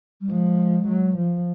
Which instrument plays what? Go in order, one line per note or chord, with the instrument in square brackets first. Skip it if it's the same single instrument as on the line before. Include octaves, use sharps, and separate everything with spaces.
[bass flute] G3
[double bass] F3 [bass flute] G#3
[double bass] F#3
F3